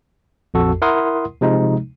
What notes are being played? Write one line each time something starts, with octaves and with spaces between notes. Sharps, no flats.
A#1 F2 F#4 A4
E4 A#4 F#5 C6 D#6
C3 F3 G#3 D#4